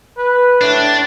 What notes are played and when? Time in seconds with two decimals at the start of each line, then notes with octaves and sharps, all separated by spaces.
0.17 B4
0.61 A2 D4